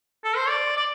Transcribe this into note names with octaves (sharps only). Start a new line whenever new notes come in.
A4
C5
D5
D5